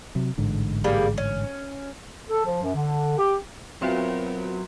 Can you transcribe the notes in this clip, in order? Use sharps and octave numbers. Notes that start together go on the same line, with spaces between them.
C3 F#3
A1 G#2 D3
G3 A#3 G#4
C#4
A4
F3
F#2
D3
G4
F#3 B3 C4 F4 F#4 A#4 E5 C6